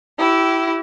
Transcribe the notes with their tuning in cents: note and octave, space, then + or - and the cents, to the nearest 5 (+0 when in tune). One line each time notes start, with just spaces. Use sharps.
E4 +0 G4 -25